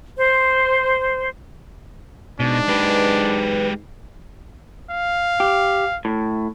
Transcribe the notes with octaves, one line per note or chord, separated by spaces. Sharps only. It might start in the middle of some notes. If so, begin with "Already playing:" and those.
C5
G#2 B2 D4
G#3 G4 B4
F5
G4
A2